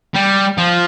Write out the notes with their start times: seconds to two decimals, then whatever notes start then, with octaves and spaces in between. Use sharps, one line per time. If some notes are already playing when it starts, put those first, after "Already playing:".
0.15 G3
0.58 F3